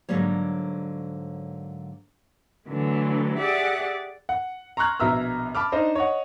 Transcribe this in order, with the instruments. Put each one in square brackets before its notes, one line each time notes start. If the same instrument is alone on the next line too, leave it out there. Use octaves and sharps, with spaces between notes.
[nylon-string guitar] G#2 D3 F#3 G3 A#3 C#5
[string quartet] D3 E3 F#3 A3
G4 G#4 D5 E5 F#5
[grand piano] F#5
A#5 C6 C#6 F6 F#6 G#6
A#1 B2 E5 A#5 E6 F6
A5 B5 D6 F6
D4 D#4 C5 D#5
C#5 D#5 F#5